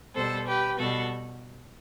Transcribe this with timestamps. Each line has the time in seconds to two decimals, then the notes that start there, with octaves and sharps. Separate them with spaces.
0.14 B2 G3 A4 C5
0.47 G4 B4
0.78 B2 G3 F#4 A4